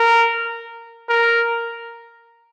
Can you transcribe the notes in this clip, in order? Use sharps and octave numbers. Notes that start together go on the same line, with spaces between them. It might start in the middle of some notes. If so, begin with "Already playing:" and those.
Already playing: A#4
A#4